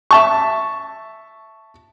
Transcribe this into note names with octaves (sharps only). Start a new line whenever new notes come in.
E5 A5 C#6